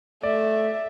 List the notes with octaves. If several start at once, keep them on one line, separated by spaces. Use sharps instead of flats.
A3 D5 E5